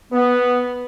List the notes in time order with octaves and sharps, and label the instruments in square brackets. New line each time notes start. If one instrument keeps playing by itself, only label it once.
[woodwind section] B3